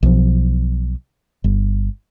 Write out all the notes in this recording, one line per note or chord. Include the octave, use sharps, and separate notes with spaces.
B1 F3
G1